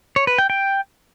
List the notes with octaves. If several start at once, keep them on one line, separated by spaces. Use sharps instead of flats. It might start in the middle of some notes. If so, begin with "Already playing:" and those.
C#5
B4
G5
G5